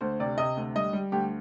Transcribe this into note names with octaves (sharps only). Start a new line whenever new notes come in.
D2 C5
C3 D5
C3 D#5
D2
G3 D#5
G3
D2 G4